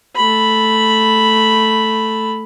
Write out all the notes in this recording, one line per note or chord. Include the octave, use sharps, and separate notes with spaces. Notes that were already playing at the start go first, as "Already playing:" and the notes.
A3 B5